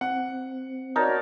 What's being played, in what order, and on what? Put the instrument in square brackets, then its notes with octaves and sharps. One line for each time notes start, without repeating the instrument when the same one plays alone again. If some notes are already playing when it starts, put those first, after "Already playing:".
[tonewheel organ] C4 [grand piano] F#5
[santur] D#4 A#4 A5 [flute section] F#4 C#5 D5